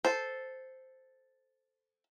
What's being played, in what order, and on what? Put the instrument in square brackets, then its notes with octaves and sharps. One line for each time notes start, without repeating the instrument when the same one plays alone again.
[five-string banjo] A4 C5